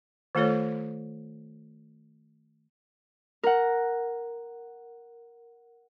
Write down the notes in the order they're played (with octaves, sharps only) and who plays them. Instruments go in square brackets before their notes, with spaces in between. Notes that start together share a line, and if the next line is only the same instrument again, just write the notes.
[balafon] D#3 A3 F4 A4 C#5
[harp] A#4 F#5